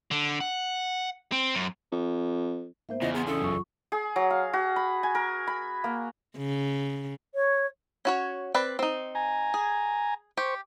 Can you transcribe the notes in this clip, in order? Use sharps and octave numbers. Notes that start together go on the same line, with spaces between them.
D3
F#5
C4
F#2
F2
G#2 A#3 B3 C5 E5 G6
E2 C#3 C#4 E4 F4 D#5
B3 G#4 A#5 C6
C#4 D4 E4 A4 F5 D#6
B1 F#2 F#3 F4 C#6
G#4
F#3
F5
F#4
B5
G#5
A#4
B5
A#3
C#3
C#5
C#4 F#4 C#5
C4 B4 D5
C4 D#4
G#5 A#5
G#4
G4 C5 C#6